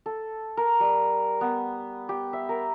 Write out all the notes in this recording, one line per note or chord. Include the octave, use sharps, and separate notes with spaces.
A4
A#4
G3
B3
G4
E5
A#4